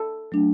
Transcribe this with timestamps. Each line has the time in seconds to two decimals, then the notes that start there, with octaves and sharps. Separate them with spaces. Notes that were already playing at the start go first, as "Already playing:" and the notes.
Already playing: A4
0.32 F#3 A3 D4